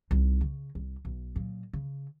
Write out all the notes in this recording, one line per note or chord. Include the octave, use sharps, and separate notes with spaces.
C2 D#4
C#3
C2
B1
A#2 F#3
C#3